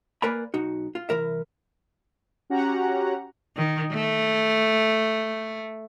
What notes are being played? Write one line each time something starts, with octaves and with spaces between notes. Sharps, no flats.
A#3 A#4 B4 D5 G#5 B5
B1 D#4 F#4
F4
C2 E3 A#4 E5
C#4 F#4 G4 F#5 A#5
D#3
A3